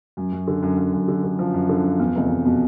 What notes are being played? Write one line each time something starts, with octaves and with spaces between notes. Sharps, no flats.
F#2
F#2
D3
F#2
F#2
F#2
D3
D3
F3
F#2
D3
F3
E2
F1
F1
B2